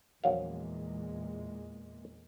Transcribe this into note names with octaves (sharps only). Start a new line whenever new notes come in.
A#1 E2 A#2 F#3 G#3 F5